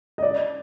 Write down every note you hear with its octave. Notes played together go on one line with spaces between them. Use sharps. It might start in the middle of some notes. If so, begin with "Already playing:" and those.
D#5
D5